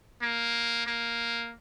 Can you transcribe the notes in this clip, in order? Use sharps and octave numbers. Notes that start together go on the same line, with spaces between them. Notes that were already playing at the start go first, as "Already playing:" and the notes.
A#3
A#3